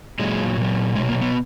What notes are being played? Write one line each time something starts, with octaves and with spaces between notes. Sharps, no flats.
A#2 F#3 G#3
A#2 F#3
B2 F#3 G#3
A#3
B3